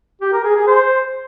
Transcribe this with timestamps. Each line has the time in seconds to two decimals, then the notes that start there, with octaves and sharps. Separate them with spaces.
0.21 G4
0.33 A#4
0.44 G#4
0.56 G#4
0.67 C5